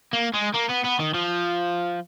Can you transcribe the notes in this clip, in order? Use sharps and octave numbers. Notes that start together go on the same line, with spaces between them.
A#3
G#3
A#3
B3
B3
D#3
F3